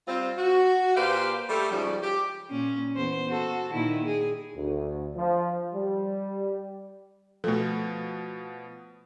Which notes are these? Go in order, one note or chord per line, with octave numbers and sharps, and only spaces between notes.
G3 C4 F4
F#4
A#2 G4 B4 C5 D5 F5
G3 A3 A4
G#2 C#3 F3 G3
G4
A#2 C#4
E2 C5
F#4 A4
A#2 D#3 E4
G#4
D2
F3
G3
B2 F3 A3 A4